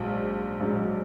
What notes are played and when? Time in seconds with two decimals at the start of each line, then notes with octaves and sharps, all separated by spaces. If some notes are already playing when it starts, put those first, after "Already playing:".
Already playing: A#1 G#2 F#3
0.60 A#1 G#2 F#3